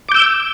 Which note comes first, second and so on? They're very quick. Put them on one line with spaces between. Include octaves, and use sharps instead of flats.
D6 G6 E6